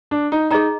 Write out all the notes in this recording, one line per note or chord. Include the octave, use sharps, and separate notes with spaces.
D4
D#4
D#4 G#4 D#5 A#5